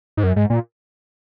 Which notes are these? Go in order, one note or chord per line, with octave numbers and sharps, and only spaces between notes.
G#2
F#2
G#2
A#2